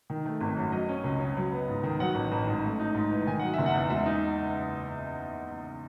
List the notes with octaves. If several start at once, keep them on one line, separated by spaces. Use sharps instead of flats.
D#3
A3
G#1
F#2
F#3 D#5
C#4
C#2
C#3
F#3
B3
G#2
D#3
F#3 F#5
A1
A1
G#2
A3
D#4
G#2
E3
D#3 G#5
F#3 F#5
F#1 E5
F#5
E2
G#3 E5
D#4